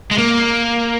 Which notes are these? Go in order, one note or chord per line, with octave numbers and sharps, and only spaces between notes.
G#3
A#3